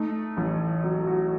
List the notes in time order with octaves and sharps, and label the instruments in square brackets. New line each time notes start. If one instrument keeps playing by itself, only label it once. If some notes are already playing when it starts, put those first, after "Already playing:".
Already playing: [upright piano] A3 D#4
A1
F#3
F#4